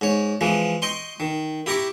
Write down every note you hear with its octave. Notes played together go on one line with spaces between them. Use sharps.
G#2 C#5
E3 F3 G#3
D#5 G5 C6 C#6
D#3
E4 G4 A#5 C#6 D6